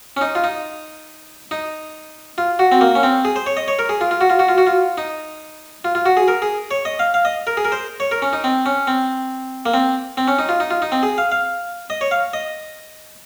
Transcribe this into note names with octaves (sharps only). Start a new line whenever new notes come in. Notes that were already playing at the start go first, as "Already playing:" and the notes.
C#4
D#4
F4
D#4
D#4
F4
F#4
C4
A#3
C#4
C4
G#4
C5
C#5
D#5
C#5
A#4
G#4
F4
F4
F#4
F4
F#4
F4
F#4
F4
D#4
F4
F4
F#4
G#4
A#4
G#4
C#5
D#5
F5
F5
D#5
A#4
G#4
A#4
C5
C#5
A#4
C#4
D#4
C4
C#4
C4
A#3
C4
C4
C#4
D#4
F4
D#4
F4
D#4
C4
G#4
F5
F5
D#5
C#5
F5
D#5